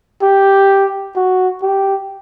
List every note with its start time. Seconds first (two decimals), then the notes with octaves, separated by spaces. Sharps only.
0.22 G4
1.16 F#4
1.62 G4